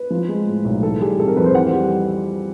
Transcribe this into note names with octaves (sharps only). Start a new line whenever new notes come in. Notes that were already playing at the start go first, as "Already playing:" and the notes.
Already playing: B4
F3
G#3
A2
B1
E3 A4
G3 G#4
C3 A4
A#4
F2 B4
C5
E3 F#5
G3